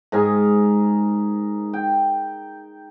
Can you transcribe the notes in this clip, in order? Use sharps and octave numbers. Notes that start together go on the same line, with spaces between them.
G#2 G#4 A#4 G#5
G5